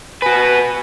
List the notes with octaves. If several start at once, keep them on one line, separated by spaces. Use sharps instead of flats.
F#4 B4 G#5